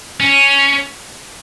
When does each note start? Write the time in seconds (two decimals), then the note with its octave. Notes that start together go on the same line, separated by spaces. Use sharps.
0.20 C#4